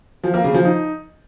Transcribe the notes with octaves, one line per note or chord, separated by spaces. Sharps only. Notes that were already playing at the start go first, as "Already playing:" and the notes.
F3
A#3
C#3
F3
D#4